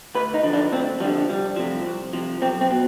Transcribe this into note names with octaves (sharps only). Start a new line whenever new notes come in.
D2 B4
D#4
D3 F3
D4
D2 C4
D3 F3 G3
C2 G3
C3 F3
C2
C3 F3
B1 C4
C4
B2